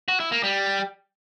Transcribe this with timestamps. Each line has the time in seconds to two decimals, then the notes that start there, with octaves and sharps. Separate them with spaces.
0.08 F#4
0.20 E4
0.32 A#3
0.43 G3